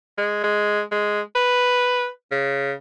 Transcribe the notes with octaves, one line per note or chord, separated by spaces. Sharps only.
G#3
G#3
G#3
B4
C#3